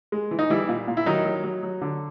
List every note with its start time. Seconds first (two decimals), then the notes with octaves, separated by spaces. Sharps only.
0.12 G#3
0.31 E3
0.39 D#4
0.50 E3 G3 E4
0.69 A#2
0.88 A#2
0.97 E4
1.06 D#3 F#3 D#4
1.25 F#3
1.44 F#3
1.63 F#3
1.81 D3